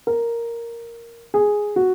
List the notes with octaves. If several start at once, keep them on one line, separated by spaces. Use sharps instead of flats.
A#4
G#4
F#4